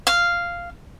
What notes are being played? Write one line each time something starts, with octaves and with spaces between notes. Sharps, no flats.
F5